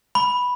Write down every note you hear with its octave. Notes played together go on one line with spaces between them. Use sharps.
B5